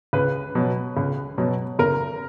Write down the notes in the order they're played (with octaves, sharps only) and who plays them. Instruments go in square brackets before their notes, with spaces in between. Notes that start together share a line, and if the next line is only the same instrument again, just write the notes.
[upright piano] C#2 B4
B2 F#3
C#2
B2 F#3
F#1 A#4